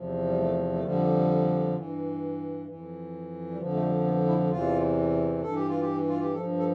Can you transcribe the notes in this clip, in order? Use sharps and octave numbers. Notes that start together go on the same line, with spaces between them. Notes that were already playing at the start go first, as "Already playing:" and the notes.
Already playing: E2 C3 F3
G3
A3
A3
F2 D3 F3 G3
G2 E3
F2 E3
G3
F2 D3 F3
A3
G3
B3
E4
E2 C3 E3 F4
G2 E3 A4
G4
F4
G4
F4
G4
G2 F3 A4
A4